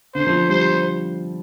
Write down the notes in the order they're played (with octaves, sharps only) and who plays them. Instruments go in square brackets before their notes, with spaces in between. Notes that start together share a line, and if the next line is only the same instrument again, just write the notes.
[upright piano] D3 [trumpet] C5
[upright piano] F3
[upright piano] G3 [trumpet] C5